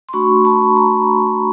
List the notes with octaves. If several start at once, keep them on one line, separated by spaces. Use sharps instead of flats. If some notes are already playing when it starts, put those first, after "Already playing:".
C6
A3 D4 F#4 B5 C#6
A5 B5
A#5 C6